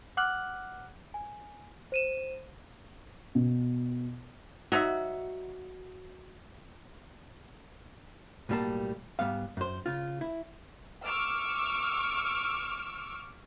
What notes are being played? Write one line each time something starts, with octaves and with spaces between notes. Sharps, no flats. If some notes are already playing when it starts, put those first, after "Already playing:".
F#5 D6 F6 F#6 F#7
G#5
C5 D#7 E7
B2
F#3 D#4 F#4 E5
B1 A2 G3 A#3 A5
G#2 G3 B3 F5
F#2 C5
C#3 F4
E4
C#6 D6 E6 F6